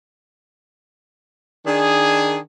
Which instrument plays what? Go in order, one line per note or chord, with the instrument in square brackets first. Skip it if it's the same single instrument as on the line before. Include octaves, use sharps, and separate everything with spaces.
[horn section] D#3 D4 G#4